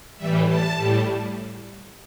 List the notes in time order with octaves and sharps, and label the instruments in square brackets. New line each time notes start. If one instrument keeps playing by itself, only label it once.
[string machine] A2 E3 G3 E5
A5
A2 G3